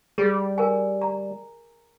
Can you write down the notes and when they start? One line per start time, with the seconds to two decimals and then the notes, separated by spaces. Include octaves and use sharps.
0.18 G3 G#4
0.58 A#4 G#5
1.02 A#5